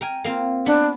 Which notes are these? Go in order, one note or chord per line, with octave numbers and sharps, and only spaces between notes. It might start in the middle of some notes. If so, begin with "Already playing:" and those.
A#4 G5 G#5
A#3 C4 F4
B3 D4